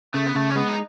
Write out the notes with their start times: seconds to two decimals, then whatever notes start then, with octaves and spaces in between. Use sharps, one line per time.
0.14 C#3 A3
0.26 B3
0.35 C#3 A3
0.50 C#4
0.55 G#3 B3
0.69 D#4